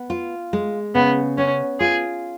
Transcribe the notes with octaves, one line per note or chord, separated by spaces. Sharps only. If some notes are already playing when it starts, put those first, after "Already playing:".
Already playing: B3
F4
G#3
C#3 B3
B3 C#4
F4 G#4